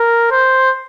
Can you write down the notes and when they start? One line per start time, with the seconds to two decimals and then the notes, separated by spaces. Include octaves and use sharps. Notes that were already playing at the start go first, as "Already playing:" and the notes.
Already playing: A#4
0.31 C5